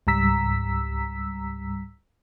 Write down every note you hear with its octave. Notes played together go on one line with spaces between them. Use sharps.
C#2 G#2 G3 A#5 E6 B6